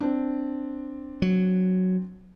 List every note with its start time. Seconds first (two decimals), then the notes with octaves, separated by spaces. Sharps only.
0.01 C4 D4
1.22 F#3